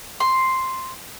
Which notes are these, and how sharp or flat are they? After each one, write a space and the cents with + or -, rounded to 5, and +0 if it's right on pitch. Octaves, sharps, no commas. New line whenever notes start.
C6 +0